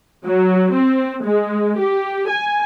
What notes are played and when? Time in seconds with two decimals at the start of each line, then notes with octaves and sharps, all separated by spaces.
0.25 F#3
0.73 C4
1.24 G#3
1.78 G4
2.29 G#5